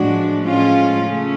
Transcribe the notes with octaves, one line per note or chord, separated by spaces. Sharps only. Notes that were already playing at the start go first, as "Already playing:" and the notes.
Already playing: A2 F3 G#3 D4 F#4
A2 F3 G#3 C#4 F4
C#3 A3 C#4